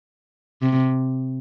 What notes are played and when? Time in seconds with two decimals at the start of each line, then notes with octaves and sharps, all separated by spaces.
0.62 C3